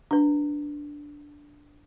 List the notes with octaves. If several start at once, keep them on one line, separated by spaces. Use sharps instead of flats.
D4 B4